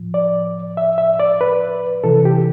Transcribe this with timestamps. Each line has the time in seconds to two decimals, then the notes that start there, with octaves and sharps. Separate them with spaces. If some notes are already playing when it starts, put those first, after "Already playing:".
Already playing: A2 F3
0.14 D5
0.77 E5
0.98 E5
1.20 D5
1.41 B4
2.04 C3 E3 A4
2.25 G4